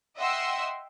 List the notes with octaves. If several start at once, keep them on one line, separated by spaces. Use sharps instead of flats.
D#5 E5 F#5 G5 C6 E6